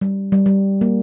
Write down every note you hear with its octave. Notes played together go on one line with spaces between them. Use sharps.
G3
G3
G3
A#3